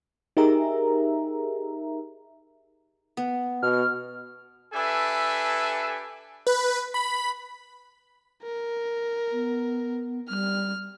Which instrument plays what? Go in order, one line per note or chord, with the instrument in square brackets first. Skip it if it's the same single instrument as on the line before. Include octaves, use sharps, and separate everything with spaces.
[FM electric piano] D#4 G4 G#4 A#4 E5 A#5
[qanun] B3
[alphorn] B2 [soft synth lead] F6
[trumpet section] D4 G4 A4 B4 E5 G#5
[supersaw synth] B4
B5
[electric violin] A#4
[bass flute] B3
[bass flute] G3 [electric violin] F6